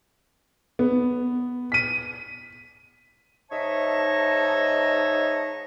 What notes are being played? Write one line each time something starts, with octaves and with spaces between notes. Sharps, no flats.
B3
B6 D#7
G#2 D#4 C#5 D#5 E5 A5